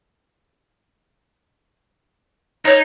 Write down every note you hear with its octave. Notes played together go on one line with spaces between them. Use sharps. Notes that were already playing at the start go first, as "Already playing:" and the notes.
D#4 C#5